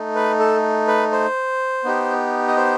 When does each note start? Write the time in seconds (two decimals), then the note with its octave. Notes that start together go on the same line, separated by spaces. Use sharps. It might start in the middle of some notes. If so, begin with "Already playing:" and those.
Already playing: A3 D#4
0.15 B4
0.40 A4
0.87 B4
1.12 C5
1.84 B3 D#4 G4
2.48 D#5
2.56 C5